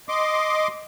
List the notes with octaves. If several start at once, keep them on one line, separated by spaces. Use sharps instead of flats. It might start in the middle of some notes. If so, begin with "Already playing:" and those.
D#5 C6 D6